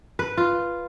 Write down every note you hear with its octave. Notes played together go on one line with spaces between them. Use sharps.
B4
F4